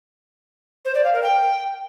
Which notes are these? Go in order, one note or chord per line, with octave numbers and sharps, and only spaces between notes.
C5
D5
F5
A#4
G5